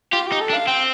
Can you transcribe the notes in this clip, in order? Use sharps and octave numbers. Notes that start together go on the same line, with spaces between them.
F4 G4
G4
D#4
A4
D4
F5
C4 G5